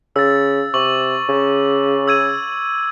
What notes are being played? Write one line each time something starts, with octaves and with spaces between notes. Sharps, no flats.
C#3 E6 A6
C3 C#6 D6 F#7
C#3
E6 G#6 D#7